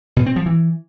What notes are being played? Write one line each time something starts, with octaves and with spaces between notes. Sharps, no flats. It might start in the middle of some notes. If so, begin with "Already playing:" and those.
B2
C4
F3
E3